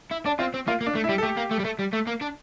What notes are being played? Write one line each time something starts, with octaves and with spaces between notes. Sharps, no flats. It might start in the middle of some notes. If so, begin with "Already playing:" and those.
E4
D4 D5
C4 F4
C4
A#3 F4
A#3
D4
A3
E4
G3
A4
A3 G4
A#3
A3
G3
A3
G3
A3
A#3
D4